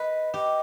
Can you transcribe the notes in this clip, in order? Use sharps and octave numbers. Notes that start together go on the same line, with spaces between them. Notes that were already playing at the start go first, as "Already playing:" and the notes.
Already playing: B4 D#5
G4 D#5